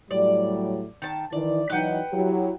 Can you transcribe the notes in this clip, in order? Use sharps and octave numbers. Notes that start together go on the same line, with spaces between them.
A2 F#3 G3 D5
D#3 A5
D#3 E3 D5
E3 F#3 D#4 B4 F#5 G5
F#3 E4 G4